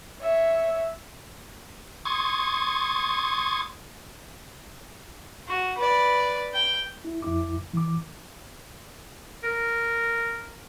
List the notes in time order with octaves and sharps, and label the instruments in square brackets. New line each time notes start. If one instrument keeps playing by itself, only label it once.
[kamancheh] C#5 E5
[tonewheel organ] C6 C#6 D#6 G#6 A6
[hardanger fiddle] F#4
B4 D5
G5
[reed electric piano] E4
F2 E4 D6
E3 D6
[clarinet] A#4